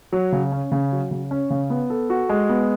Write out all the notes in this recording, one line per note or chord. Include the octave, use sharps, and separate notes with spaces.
F#3
C#3
C#4
C#3
F#3
C#3
C#4
C#3
B3
A4
F#4
G#3
B3